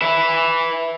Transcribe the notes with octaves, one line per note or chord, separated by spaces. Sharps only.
B4 E5